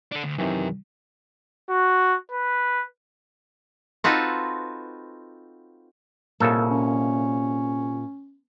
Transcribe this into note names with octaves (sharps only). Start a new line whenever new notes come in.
D4 A4
D2
F#2 C3 D#3 E3
F#4
B4
C4 D#4 F4 F#4 A4 B4
C2 A#2 C#3 A4
C#4